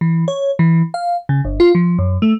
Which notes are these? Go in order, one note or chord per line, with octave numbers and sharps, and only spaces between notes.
E3
C#5
E3
F5
C#3
G1
F4
F3
F#2
A3